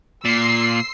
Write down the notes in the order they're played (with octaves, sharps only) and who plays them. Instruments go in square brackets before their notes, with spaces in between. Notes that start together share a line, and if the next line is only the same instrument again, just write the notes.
[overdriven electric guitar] A#2 [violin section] C6 E6 C7